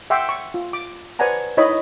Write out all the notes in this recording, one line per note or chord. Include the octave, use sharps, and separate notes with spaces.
E5 F#5 G5 C6 D6
C#6
F4
D6
B4 C5 D5 F#5 G#5 A#5
D#4 E4 C#5 D#5 B5